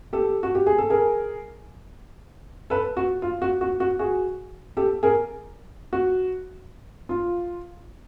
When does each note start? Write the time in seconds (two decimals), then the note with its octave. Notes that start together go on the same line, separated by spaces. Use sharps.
0.13 G4 A4
0.43 F#4
0.55 G4
0.67 G#4
0.78 A4
0.90 G#4 A#4
2.70 A4 B4
2.97 F#4
3.22 F4
3.42 F#4
3.61 F#4
3.80 F#4
3.99 F#4 G#4
4.77 G4 A4
5.03 G#4 A#4
5.93 F#4
7.09 F4